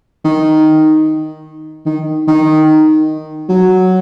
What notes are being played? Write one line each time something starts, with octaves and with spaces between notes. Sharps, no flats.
D#3
D#3
D#3
F#3